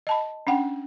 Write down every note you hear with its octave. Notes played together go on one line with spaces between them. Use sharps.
D#5 A5 B5
C#4 D4 F#5 G5